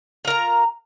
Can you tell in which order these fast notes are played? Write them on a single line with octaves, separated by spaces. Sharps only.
F4 A#4 A#5